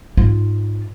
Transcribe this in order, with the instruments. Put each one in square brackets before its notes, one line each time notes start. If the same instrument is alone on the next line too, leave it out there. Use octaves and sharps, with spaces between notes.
[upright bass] G#2 F4